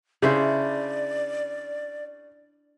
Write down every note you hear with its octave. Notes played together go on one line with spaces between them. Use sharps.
C#3 D4 E4 C5 D5